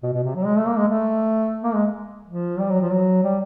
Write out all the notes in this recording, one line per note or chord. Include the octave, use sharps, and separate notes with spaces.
B2
B2
C3
F#3
G#3
A3
A#3
G#3
A3
A#3
G#3
F3
G3
F#3
F3
F#3
G3